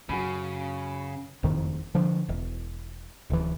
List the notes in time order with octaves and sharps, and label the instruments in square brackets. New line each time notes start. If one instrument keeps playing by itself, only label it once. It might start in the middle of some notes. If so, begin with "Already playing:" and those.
[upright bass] F#2 [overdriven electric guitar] C#3 [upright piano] F#4 G#5 B5
[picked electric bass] F#1 F2 D#3
D3 F3
E1
D1 E3